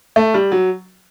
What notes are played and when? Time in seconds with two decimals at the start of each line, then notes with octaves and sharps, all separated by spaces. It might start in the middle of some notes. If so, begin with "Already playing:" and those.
0.16 A3
0.34 G3
0.52 F#3